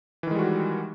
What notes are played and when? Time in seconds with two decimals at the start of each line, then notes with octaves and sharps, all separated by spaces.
0.23 E3
0.27 D#3
0.31 G#3
0.35 G3
0.39 F#4